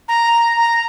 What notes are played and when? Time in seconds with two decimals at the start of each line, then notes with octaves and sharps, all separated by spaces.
0.08 A#5
0.57 A#5